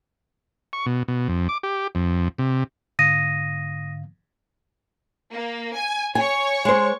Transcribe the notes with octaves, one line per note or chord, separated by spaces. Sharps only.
C#6
B2
B2
F2
D6
G4
F2
C3
G#2 D3 F5 D#6 A#6 D#7
A#3
G#5
C#5 G#5 C#6
G#3 C5